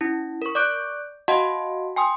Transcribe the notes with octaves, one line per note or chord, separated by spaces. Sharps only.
C#4 E4
A#4 C#6
D5 C#6 D6 F#6 G6 D7
F#4 D#5 F5 F#5 A5 C6
G5 G#5 C6 D#6